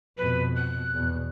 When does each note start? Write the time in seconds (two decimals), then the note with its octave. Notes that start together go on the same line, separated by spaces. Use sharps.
0.18 F2 B2 B4
0.56 F#6
0.94 E2 B2